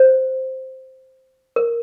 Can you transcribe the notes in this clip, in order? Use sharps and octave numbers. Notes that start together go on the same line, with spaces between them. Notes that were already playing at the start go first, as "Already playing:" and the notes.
Already playing: C5
A#4